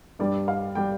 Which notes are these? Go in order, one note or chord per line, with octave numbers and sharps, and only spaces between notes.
G2 G3 D5
F5
G3 G5